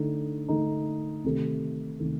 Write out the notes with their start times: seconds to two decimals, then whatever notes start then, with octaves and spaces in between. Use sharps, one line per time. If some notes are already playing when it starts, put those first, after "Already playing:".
Already playing: D3 A3 D#4
0.48 D3 A3 D#4
1.24 C3 D#3 A3
1.99 C3 D#3 A3